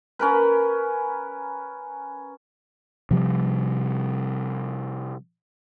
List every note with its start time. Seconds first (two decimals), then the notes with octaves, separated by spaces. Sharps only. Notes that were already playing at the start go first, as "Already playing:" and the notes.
0.19 C#4 A#4 B4
3.11 C3 F3 G3